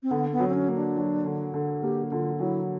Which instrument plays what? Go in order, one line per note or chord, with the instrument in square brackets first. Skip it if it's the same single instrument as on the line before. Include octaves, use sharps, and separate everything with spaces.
[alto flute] C4
[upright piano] D3 [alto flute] B3
[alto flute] B3
[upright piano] F#3
[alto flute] C4
C#4
[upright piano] A#3
[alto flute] D4
[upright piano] F#3
D3
D3
[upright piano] A#3 [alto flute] G4
[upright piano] D3 [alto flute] F4
[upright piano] F#3 [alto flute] E4